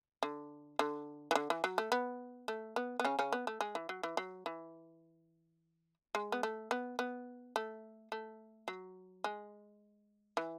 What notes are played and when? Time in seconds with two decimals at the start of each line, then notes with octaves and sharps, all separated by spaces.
0.23 D3
0.79 D3
1.31 E3
1.35 D3
1.50 E3
1.64 F#3
1.78 A3
1.92 B3
2.48 A3
2.76 B3
3.00 B3
3.05 C#3 C#4
3.19 C#3 C#4
3.32 B3
3.47 A3
3.61 G#3
3.75 E3
3.89 F#3
4.03 E3
4.17 F#3
4.46 E3
6.15 G#3
6.32 B3
6.43 A3
6.71 B3
6.99 B3
7.56 A3
8.12 A3
8.68 F#3
9.24 G#3
10.37 E3